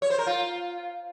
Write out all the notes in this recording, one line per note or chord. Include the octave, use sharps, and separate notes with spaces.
C#5
C5
A#4
F4